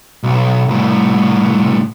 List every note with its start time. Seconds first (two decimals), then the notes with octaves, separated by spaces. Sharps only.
0.23 B1
0.68 C2 A2